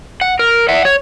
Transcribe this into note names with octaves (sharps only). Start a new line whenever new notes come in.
F#5
A#4
E5 F#5
C#5